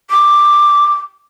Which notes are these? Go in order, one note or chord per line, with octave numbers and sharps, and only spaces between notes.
D6